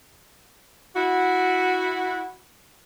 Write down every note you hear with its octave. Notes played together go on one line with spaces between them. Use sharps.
E4 F#4